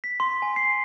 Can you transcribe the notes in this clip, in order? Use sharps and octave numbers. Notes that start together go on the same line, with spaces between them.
B6
C6
G#5
C7